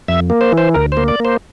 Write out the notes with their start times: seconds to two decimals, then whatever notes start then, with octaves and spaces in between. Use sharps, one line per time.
0.08 F2 E5
0.30 A#3
0.41 C5
0.52 E3
0.58 C5
0.74 D2 A#4
0.92 A#3 C5
1.08 D5
1.20 A#3
1.25 C5